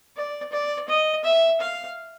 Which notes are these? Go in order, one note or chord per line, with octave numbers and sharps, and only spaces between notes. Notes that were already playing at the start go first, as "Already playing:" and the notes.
D5
D5
D#5
E5
F5